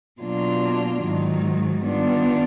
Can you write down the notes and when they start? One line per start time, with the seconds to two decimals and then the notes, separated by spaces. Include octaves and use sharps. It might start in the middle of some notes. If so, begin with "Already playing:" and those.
0.21 B2 F#3 A#3 D4 F4
1.03 G#2 D#3 F#3
1.82 D#3 G3 B3 D4 F4